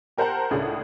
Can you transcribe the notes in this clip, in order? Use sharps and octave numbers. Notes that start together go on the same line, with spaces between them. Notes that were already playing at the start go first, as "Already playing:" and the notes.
G4 A#4 C5 F#5 A5 A#5
C#2 A2 C#4 D4 G#4 F#5